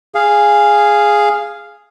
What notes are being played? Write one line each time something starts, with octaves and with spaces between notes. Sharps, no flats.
G#4 F5